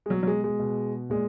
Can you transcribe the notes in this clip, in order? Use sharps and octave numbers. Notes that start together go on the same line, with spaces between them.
G#3
B2 F#3
F#3
G#3
G#3
B2
A#2 G#3